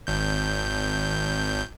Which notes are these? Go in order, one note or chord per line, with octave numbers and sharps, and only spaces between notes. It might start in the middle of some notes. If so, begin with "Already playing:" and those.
G#1 G6